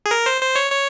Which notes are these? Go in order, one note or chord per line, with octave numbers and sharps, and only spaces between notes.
G#4
A#4
C5
C5
C#5
C#5